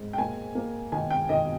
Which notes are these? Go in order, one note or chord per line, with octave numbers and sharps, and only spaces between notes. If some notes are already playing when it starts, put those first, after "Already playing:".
Already playing: G#2
G5
A#3 G#5
A#3
D#3 G#5
G5
D#3 D#5